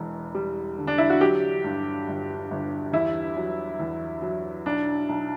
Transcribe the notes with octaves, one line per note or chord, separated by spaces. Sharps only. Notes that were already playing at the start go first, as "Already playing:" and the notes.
Already playing: E1 E2
G3
D3
D4
E4
F#4
F#3 G4
G2
G1
G1
E2 E4
F#3
E2
F#3
B1 D4
B1